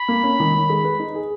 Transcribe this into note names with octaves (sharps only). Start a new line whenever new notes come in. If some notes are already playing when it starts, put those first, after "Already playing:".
Already playing: B5
A#3
C#4
D#3
D#3
G#3
B4
D#4
G#4